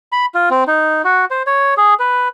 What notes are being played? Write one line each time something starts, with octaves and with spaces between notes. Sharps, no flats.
B5
F4
C4
D#4
F#4
C5
C#5
G#4
B4